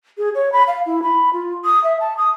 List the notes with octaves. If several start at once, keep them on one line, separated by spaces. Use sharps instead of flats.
G#4
C#5
B5
F5
E4
B5
F4
D#6
E5
A5
D#6